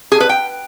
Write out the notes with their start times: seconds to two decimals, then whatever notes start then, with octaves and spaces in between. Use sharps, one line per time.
0.12 G#4
0.20 B4
0.29 G5